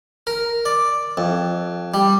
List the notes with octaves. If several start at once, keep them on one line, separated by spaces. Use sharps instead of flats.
A#4
D5
F2
G3